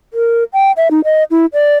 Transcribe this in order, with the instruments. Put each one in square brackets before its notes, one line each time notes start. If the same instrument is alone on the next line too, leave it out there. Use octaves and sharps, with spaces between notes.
[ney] A#4
G5
E5
D#4
D#5
E4
D5